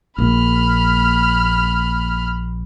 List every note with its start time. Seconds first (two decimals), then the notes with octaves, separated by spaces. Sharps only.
0.18 A#1 A#3 B5 F6